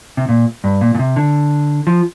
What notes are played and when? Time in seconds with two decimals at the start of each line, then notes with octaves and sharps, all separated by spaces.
0.17 C3
0.29 A#2
0.64 G2
0.81 A#2
0.95 A#2
0.99 C3
1.16 D3
1.87 F3